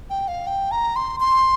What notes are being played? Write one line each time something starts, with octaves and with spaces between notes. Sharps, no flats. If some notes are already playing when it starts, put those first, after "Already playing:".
G5
F5
G5
A#5
C6
C6